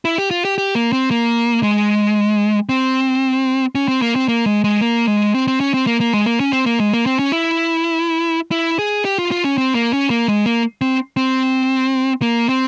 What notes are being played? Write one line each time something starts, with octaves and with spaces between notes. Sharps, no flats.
E4
G4
F4
G4
G4
A#3
C4
A#3
G#3
C4
C#4
C4
A#3
C4
A#3
G#3
G#3
A#3
G#3
C4
C4
C#4
C4
A#3
A#3
G#3
A#3
C#4
C4
A#3
G#3
A#3
C4
C#4
E4
E4
G#4
G4
F4
F4
C#4
C4
A#3
C#4
A#3
G#3
A#3
C4
C4
A#3
C4